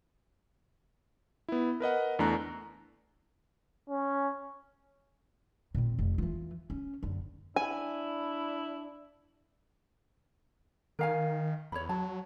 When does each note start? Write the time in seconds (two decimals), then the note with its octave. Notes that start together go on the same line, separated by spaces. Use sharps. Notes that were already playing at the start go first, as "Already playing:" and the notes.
1.48 B3 E4
1.80 A#4 B4 D#5 F#5
2.19 E2 A3 D4 A#5 F#6
3.89 C#4
5.75 A#2 C4
5.99 F1
6.18 E3 F4
6.70 C#4
7.03 F#1 D3
7.56 D4 E4 G#5
10.99 D#3 A#4 F5 G#5
11.72 E2 C#5 B5
11.89 F#3 A5